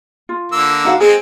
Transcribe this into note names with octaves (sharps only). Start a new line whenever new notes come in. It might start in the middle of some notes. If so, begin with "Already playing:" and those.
F4
D3 A#3 E6
D#4 F#4 F5
G#3 C4 G#4